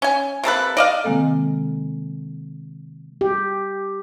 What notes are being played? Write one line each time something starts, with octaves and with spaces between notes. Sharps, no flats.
C#4 G#5
C3 A#3 A4 B4
D5 D#5 F5
C3 D#3 G#3 A#3 C4 A4
G4